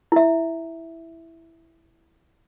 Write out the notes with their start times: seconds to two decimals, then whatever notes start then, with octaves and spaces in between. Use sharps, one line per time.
0.12 E4 E5